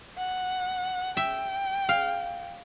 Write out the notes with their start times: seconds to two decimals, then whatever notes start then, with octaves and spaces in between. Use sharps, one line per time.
0.18 F#5
1.17 E5 G5
1.89 F5